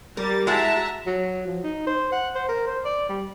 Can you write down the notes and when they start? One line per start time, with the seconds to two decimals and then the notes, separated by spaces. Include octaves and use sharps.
0.17 G3 A#4 A6
0.47 G#3 E4 F#4 E5 A5 A#5
1.07 F#3
1.47 F3
1.64 D#4
1.87 C5
2.12 F#5
2.35 C5
2.48 A#4
2.67 C5
2.85 D5
3.09 G3